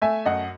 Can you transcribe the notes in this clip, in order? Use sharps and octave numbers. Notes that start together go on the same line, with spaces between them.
A3 E5 G#5
F#2 D#5 F#5